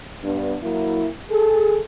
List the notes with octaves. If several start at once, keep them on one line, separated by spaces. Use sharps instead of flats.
G2 B3 D4
F#3 A#3 E4
G#4 A4